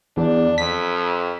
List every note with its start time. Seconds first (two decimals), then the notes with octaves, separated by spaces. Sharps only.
0.17 E2 D4
0.58 F2 B6